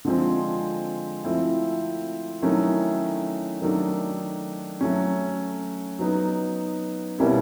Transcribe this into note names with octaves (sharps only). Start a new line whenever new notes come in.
D3 F3 G#3 C4
F3 A3 C4 E4
D#3 F#3 A3 C#4 E4
D#3 F#3 A3 D4
F#3 A3 C#4
F#3 B3 D#4
B2 G3 A#3 C#4 E4